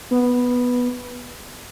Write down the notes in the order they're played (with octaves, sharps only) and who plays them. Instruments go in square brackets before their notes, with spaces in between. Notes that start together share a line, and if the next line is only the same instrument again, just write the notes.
[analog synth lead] B3